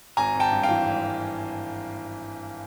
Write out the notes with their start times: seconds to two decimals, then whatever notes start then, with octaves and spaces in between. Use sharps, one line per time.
0.17 G#1 G#5 A#5
0.35 G#1
0.40 G5 A5
0.52 G2
0.63 F5 G5
0.69 E3
0.86 G#1
1.04 G#1